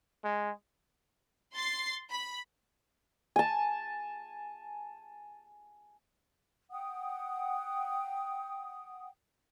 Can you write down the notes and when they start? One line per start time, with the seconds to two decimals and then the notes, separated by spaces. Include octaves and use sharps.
0.24 G#3
1.53 C6 A6 C7
2.10 B5
3.36 G#5 A5
6.71 F#5 G5 D#6